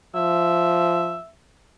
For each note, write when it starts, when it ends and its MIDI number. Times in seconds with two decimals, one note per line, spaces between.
0.15 1.19 53
0.15 1.29 76